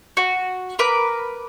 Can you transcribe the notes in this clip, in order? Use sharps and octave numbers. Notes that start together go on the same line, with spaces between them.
F#4
A#4 B4 D6